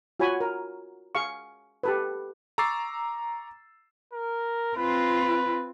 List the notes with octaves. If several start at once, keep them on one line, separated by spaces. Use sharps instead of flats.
F4 F#4 C#5 G#5 B5
A#4
G#4 F5 C#6
G4 A4 B4
A#5 C#6 D6 E6 A6 C7
A#4
C4 F4 B4